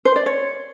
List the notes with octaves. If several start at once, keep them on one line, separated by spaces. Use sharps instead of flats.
C5
D5
C#5